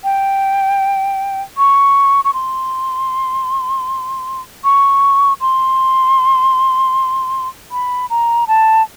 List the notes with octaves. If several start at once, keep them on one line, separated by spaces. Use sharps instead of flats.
G5
C#6
C#6
C6
C#6
C6
B5
A#5
A5